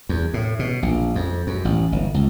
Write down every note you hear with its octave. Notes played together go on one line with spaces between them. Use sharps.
E2
A2
B2
A#1
F2
F#2
A1
G1
C#2